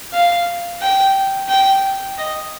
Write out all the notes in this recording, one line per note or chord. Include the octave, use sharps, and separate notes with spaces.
F5
G5
G5
D#5